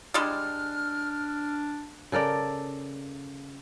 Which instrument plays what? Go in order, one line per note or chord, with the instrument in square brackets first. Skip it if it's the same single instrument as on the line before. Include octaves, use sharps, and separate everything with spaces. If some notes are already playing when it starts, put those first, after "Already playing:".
[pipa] G3 G#3 [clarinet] D4 [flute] F6
[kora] C#3 A4 A#4 D5